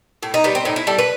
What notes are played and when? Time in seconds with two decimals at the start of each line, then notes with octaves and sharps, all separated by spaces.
0.23 A2
0.34 D#4
0.44 G3 B3
0.55 C4
0.65 A2 D#4
0.76 E4
0.87 G3 A4
0.98 B4